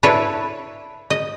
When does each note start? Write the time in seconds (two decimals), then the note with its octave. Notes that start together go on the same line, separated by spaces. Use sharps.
0.03 D4 E4 A4 B4 C#5
1.10 D#5